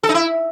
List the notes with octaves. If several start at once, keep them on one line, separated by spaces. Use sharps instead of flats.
A4
D#4
E4